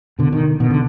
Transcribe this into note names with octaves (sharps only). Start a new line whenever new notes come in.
B2 D3
D#3
B2 D#3
D3